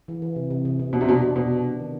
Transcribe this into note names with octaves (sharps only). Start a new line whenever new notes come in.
E3
E3
C3
C3
C3
C3
B2 D4
C3
B2 D4
D4
B2 D4
B3
D4
D#3